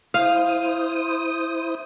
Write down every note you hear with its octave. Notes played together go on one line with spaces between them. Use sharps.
E4 C5 F5 D#6